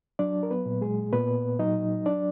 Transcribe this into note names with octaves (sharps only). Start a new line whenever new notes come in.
F#3 D4 D5
A#4
B3 B4
A#2
G#3 G#4
A#2 B3 B4
F#3 D#4 D#5
D4 D5